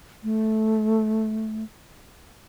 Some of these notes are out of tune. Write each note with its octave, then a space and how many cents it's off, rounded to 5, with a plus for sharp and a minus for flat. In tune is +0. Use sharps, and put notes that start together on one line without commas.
A3 -10